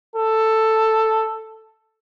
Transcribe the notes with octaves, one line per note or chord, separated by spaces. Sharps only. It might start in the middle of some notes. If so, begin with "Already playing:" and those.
A4